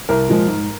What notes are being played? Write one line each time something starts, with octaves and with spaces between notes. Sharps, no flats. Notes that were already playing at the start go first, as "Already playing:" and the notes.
C2 A#4
A#2 F3 G#3
G#2